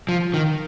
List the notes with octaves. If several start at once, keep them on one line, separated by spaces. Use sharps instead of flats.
F3
D#3